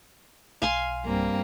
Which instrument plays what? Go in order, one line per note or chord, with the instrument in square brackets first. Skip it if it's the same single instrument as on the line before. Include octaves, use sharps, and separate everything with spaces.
[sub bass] B1 [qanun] F5 G#5 C6
[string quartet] G2 A#3 C4